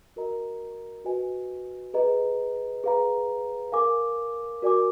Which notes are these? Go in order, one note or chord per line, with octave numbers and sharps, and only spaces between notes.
F#4 A#4 D#5 A#5
F#4 B4 D#5 G#5
G#4 B4 D#5 A#5
G#4 B4 F5 A#5
A#4 F5 G#5 D6
F#4 A#4 D5 G#5 D6